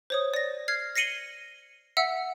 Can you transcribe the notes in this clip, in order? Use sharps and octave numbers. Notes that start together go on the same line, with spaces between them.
C5 C#5 D#6
D5 A#6
F6 G#6 C7
A#6 C7 C#7 D#7 F#7 G7
E5 F#5 E6